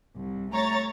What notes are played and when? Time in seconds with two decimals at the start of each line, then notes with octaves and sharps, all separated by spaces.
0.17 C2
0.52 A3 C#5 A#5 A6